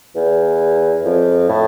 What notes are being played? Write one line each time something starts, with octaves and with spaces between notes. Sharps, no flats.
E2
F2
A2